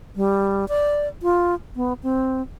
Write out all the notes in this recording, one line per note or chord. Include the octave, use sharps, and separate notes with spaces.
G3
D5
F4
B3
C4